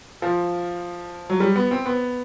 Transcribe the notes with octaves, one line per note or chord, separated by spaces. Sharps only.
F3
F#3
G3
B3
C4
B3